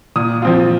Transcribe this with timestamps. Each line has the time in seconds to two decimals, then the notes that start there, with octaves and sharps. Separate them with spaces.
0.16 A#2 D#6
0.42 F3 C4 F4